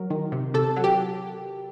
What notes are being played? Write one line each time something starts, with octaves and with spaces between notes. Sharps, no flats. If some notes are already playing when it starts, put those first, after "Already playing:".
Already playing: F#3 A#4
D#3
C3
C3 A4
F#3
G4